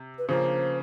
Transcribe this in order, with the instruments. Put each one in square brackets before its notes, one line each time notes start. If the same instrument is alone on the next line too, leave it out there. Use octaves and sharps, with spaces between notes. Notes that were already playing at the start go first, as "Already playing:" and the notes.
Already playing: [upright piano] C3
[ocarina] B4
[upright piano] C#3 F3 A#3 [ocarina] C5